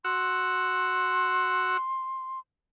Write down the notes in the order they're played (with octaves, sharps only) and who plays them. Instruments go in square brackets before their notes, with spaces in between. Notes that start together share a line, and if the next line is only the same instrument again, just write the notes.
[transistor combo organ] F#4 F#5 E6 [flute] C6